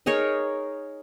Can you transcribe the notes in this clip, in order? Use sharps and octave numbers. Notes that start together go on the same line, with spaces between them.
D#4 G#4 A#4 C#5